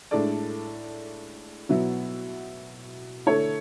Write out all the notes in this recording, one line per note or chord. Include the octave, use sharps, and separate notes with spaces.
A2 G#3 D4 A4 D5
B2 F#3 B3 E4
D3 A3 E4 A4 C#5